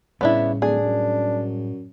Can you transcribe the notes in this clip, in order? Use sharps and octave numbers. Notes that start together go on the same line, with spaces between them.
A2 C#3 G3 B3 C#4 D4 E4
D1 D4 G#4
F#2